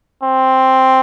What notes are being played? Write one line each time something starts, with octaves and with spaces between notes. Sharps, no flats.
C4